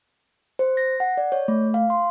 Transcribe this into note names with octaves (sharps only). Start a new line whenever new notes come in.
C5
A#6
F#5
D5
C#5
A3
F5
C6